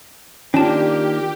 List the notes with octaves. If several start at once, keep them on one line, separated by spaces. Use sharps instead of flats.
D#3 A#3 C#4 D4 F4 G4 A5